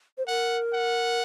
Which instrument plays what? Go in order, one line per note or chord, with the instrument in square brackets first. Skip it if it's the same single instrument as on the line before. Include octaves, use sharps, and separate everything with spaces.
[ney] C5
[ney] A#4 [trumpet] F#5
[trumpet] F#5